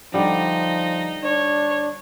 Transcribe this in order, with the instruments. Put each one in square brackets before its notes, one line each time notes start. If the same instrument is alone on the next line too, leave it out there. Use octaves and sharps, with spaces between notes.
[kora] D3 G3 [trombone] F3 [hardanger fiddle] D#4
[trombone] D4 [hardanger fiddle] C#5